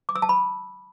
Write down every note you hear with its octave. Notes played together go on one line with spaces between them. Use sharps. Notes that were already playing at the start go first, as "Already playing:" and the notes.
D6
E6
A5
B5